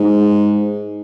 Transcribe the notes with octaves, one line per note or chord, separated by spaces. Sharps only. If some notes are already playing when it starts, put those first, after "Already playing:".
Already playing: G#2